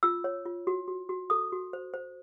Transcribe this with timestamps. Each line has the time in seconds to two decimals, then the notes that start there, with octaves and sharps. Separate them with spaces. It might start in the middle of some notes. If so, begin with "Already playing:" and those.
0.03 F4 E6
0.24 C#5
0.45 F4
0.67 F#4
0.88 F#4
1.09 F#4
1.30 A4 D#6
1.52 F#4
1.73 C5
1.94 C5